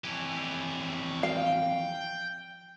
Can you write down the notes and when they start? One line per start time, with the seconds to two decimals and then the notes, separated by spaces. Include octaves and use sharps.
0.04 F2 E3 G4 C#5
1.23 F5 G5